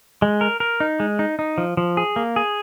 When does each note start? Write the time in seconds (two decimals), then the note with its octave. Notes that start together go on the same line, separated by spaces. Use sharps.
0.22 G#3
0.41 A#4
0.60 A#4
0.80 D#4
1.00 G#3
1.19 D#4
1.39 D#4
1.58 F3
1.77 F3
1.97 G#4
2.16 A#3
2.36 G#4